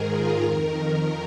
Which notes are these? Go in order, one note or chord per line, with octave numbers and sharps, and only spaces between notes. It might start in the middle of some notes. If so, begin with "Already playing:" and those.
Already playing: G#2 D#3 G#4 A#4
F4
F2 D#3 A#4
A#4